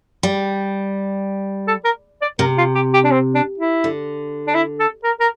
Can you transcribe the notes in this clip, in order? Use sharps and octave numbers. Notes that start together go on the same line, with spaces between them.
G3
A4
A#4
D5
C3 A#4
F4
G4
G4
D4
C4
D4
E4
D3
D4
E4
A4
A#4
A#4